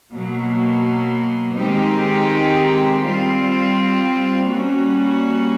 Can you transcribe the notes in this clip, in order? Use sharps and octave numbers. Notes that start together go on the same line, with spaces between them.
B2 F#3 A#3
D#3 G#3 C4 D#4 G4
G3 C4 F4
G3 A#3 C#4 F#4